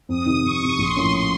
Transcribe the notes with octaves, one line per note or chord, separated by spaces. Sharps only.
F2 D#6
C3 D#3
F2 C#6
C3 D#3
A#1 C6
A2 F3 A#3 C#4